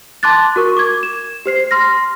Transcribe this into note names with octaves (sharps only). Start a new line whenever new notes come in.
A5 C6 D6 F#6 A6
F#4 A#4 C#6
D6 G#6
E7
G4 C5 C7
C6 F6 A#6